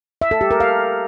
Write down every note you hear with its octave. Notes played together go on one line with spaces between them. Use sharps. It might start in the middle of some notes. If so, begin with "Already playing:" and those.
E5
A4
G4
A#4
F5